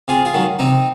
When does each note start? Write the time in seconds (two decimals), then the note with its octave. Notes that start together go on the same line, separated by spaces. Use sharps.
0.08 C3 F4 G#4
0.25 F4 G#4
0.34 D#3 F#3
0.59 C3 C4 D#4